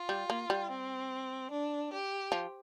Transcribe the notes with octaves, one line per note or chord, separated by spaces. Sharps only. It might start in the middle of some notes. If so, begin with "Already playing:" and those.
Already playing: F4
G3
A#3
G3
C4
D4
G4
F3